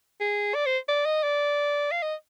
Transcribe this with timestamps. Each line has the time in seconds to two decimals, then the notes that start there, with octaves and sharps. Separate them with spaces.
0.20 G#4
0.55 D5
0.66 C5
0.88 D5
1.05 D#5
1.23 D5
1.92 F5
2.03 D#5